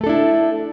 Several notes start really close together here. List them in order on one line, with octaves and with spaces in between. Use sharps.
A3 A4 D4 E4